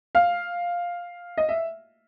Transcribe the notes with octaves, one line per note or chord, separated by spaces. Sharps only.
F5
D#5
E5